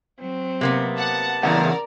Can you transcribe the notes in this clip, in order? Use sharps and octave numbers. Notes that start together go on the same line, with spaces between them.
F#3 C4
C3 A#3 B3
F#5 A5
E2 C#3 A#4 D5 F#5